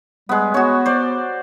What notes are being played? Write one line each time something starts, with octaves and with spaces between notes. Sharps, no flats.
G3 G#3 B3
B3 F#4 C#5
C5 D5